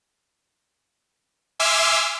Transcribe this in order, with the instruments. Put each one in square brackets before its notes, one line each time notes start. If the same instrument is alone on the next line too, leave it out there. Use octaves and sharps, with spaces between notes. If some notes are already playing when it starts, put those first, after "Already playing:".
[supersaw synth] E5 G#5 C6 D6 E6 F6